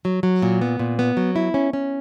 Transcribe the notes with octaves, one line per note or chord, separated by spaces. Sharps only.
F#3
F#3
A#2
B3
A#2
B3
F#3
E4
C#4
C#4